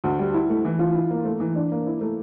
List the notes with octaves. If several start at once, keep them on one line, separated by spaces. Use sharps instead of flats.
D2
G3
E4
A3
E3
F4
E4
A#3
A3
E3
D4
A#3
E4
A3